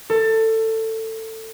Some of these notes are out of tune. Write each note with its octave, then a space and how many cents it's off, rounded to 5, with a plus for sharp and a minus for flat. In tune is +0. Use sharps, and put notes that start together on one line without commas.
A4 +20